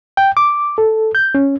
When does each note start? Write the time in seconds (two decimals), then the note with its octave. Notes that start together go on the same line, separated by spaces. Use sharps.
0.17 G5
0.37 D6
0.78 A4
1.15 G6
1.35 C#4